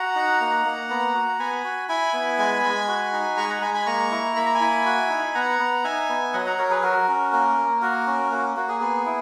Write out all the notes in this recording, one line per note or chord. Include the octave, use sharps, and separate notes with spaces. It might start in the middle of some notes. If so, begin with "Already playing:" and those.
Already playing: F#4 F#5 A#5
D#4
A#3
A#3
B3
F#4
B3 G#5 B5
F#4
E4 G#5 B5
B3
G#3
G#3
F#4
D#4
G#3 A#5 C#6
F#5 A#5
G#3 G#5 B5
G#5 B5
A#3 A#5 C#6
E4
A#3 B5
A#5
G#5 B5
E4
F#4
D#4
B5
B3 F#5 A#5
B3
D#4 E5 G#5
B3
F#3 D#5 F#5
F#5 A#5
F#3 A#4 C#5
G#4 B4
F#4 A#4
C#4
A#3
A#3
F#4 A#4
C#4
A#3 F#4
A#3 F#4
G#4
B3 G#4
E4